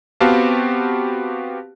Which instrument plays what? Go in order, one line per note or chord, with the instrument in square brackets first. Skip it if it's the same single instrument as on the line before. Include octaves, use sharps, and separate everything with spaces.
[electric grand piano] B3 C4 F#4 G4 F5 A5